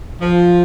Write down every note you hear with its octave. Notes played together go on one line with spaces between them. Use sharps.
F3